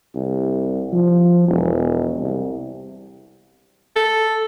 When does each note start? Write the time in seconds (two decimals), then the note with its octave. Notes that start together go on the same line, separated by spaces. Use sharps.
0.15 C2
0.93 F3
1.48 E1
2.20 C2
3.96 A4